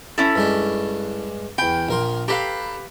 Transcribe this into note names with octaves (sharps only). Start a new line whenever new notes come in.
C#4 E4 A4
G2 G#3 D4
E2 G5 B5
A#1 A#4 C6
G4 A4 B4 F5 A5 A#5